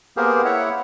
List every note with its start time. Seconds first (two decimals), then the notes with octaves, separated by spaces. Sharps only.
0.17 A#3 B3 G4 G#4 A#4 C5
0.45 E4 C#5 E5 F#5